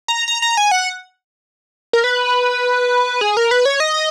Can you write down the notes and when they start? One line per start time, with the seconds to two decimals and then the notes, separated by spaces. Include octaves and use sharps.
0.08 A#5
0.28 A#5
0.42 A#5
0.57 G#5
0.71 F#5
1.93 A#4
2.04 B4
3.21 G#4
3.37 A#4
3.51 B4
3.65 C#5
3.80 D#5